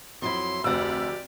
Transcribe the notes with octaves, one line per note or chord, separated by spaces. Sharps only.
F2 F#3 E4 C6
F1 D2 G4 D5 F#5 E6